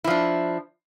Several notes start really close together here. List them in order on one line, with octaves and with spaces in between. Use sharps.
E4 F3 D4